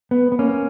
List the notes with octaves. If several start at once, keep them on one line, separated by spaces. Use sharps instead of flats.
B3
B3
A#3 C#4